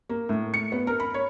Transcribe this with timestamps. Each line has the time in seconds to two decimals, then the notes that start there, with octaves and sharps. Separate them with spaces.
0.09 A#3
0.29 A2
0.54 C#7
0.72 B3
0.87 A#4
1.00 B5
1.14 C#5